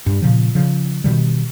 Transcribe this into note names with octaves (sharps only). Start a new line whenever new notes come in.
G2
A#2 C#3 F3
C#3 F3
B2 D#3 G3